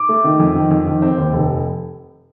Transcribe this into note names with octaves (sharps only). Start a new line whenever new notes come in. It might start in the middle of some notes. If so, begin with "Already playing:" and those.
Already playing: D6
A3
D#3
F2
D#3
F2
D#3
C4
D#2
F1